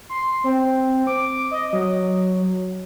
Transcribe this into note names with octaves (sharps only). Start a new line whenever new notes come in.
C6
C4
D6
D#5
F#3